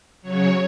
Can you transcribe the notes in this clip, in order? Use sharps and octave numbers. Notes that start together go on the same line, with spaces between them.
C#3 F#3 C#5